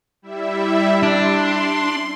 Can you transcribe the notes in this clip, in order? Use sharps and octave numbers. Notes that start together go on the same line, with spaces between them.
G3 E4 E5
D4 C6